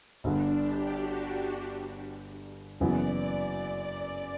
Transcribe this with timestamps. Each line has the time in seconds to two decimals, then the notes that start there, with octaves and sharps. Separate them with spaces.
0.24 G1 G2 D3 D4
0.56 G4
0.88 F#4
2.80 F#1 F#2 E3 B3 D5